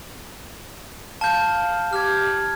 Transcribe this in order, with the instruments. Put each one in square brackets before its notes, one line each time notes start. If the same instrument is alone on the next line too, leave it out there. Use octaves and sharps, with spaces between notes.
[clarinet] F5 [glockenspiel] A5 G6
[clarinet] G4 [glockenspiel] F6 G#6